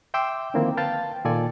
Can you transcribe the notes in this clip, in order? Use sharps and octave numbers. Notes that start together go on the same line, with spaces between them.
E5 G5 C6 D6 E6
D3 D#3 F3 A#3 C4 E4
B4 F5 G5 A5 A6
A#2 D#3 F4 A4 D5 G#5